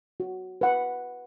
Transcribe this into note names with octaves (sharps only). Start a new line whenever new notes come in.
F#4
B4 F#5